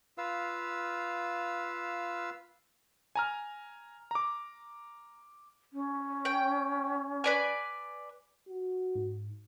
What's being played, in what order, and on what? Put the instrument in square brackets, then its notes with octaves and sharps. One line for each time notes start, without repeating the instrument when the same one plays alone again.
[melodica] F4 B4 F5 E6
[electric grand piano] G#5 A#5 F6
A#5 D6
[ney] C#4
[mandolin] G5
B4 D5 G#5
[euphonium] F#4
[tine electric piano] G#2